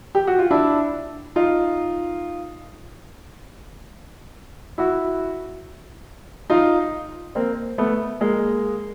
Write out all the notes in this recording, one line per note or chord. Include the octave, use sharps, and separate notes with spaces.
G4
F#4
F4
D4 E4
D#4 F4
E4 F#4
D#4 F4
A#3 C4
A3 B3
G#3 A#3